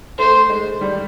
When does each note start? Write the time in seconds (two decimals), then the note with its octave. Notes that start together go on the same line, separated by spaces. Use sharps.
0.18 A3 C5
0.50 G#3
0.81 G3